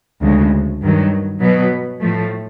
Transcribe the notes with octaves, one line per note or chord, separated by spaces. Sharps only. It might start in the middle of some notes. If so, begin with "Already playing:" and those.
D2 C#3 F3 G#3
G2 D#3 F#3
B2 F#3 B3
A2 F3 A3